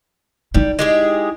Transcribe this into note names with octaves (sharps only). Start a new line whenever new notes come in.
G3 D#4 E4
G#3 G4 G#4